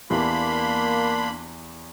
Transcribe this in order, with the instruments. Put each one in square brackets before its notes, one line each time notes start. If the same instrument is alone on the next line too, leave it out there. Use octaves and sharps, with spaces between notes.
[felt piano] E2 E3 G4 [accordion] A#3 B5 [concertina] D4 C6